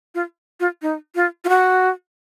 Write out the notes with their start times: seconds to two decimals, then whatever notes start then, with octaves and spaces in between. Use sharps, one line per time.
0.15 F4
0.60 F4
0.82 D#4
1.15 F4
1.45 F4
1.49 F#4